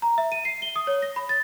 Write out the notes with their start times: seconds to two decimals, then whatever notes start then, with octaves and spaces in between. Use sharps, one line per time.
0.02 A#5
0.18 E5
0.32 D#7
0.45 C7
0.62 G7
0.76 D#6
0.87 C#5
1.02 A#6
1.16 B5
1.29 A6